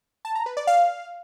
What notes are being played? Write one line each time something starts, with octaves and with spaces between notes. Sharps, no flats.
A5
A#5
B4
D5
F5